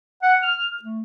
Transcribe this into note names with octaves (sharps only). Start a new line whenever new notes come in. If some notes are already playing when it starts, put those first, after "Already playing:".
F#5
F6
A3